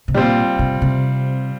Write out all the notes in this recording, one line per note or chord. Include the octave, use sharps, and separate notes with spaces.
C3
A#2 G3 C4 F4
C3
C3